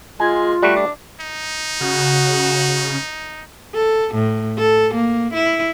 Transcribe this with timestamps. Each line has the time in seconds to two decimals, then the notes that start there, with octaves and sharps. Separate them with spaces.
0.20 G#3 F4 G#5
0.63 G3 A3 F#4
0.76 D4
1.21 D#4
1.81 C#3 F#4
3.74 A4
4.15 A2
4.58 A4
4.94 A#3
5.33 E4